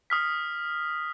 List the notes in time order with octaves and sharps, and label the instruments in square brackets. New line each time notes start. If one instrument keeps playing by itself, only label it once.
[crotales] D#6 F6 B6